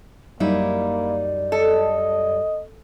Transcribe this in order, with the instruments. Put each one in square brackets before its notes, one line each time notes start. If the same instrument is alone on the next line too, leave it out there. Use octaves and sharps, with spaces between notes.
[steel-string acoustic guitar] F#2 G3 D#4 [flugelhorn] A#3 [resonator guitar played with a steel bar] E4 [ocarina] D5
[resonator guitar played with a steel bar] A4 [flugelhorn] D#5